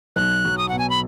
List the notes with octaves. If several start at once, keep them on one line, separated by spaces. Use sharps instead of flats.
B1 F#6
F#3
D#6
B2 F#5
G#5
B5